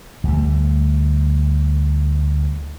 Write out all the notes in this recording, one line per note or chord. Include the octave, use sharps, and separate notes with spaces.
D2 G3 A3